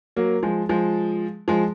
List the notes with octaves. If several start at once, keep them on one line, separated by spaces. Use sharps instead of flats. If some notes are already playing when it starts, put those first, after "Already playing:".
F#3 A#3
F3 G#3
F3 G#3
F3 G#3